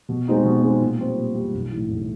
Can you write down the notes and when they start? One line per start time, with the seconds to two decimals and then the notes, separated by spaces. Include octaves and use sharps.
0.09 B2
0.28 G#3 C4 D#4 F#4
0.45 B2
0.63 G#3 C4 D#4 F#4
0.81 A#2
0.99 G3 C4
1.16 A#2
1.35 G3 C4
1.54 B1
1.71 A2 E3
1.89 B1